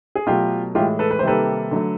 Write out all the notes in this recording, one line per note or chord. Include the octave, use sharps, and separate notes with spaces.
G#4
B2 F#3 A3 F4 G4
A2 E3 G#3 F4 G4
A4 B4
B4
C5
C3 D#3 G3 A#3 A4 B4
D3 F#3 A3